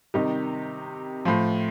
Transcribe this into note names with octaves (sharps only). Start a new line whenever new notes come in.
C3 D#3 G3 D#4 G4
A2 F3